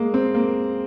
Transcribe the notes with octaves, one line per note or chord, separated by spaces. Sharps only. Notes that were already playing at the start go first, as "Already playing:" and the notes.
Already playing: G#3 A#3
C4
A#3